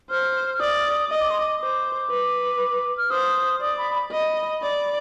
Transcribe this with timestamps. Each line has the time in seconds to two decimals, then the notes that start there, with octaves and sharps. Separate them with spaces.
0.10 C5 F6
0.54 F6
0.60 D5 D#6
1.10 D#5 D#6
1.20 D6
1.30 C6
1.40 D6
1.61 C5 D6
2.11 B4
2.97 F6
3.11 C5 D#6
3.62 D5 D#6
3.78 B5
3.95 B5
4.12 D#5
4.63 D5